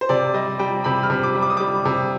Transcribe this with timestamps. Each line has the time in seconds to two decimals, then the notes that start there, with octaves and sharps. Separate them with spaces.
0.01 C5
0.09 C3 D5
0.34 G3 D#5
0.59 G3 G5
0.84 C3 B5
1.03 F6
1.10 C3
1.23 D6
1.35 G3
1.42 D6
1.50 D#6
1.57 G3 D6
1.85 C3